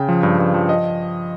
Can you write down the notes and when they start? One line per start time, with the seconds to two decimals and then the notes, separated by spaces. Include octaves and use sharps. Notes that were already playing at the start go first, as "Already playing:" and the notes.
Already playing: C#3 G5
0.09 F3
0.23 G2
0.39 G2
0.54 F3
0.69 D#5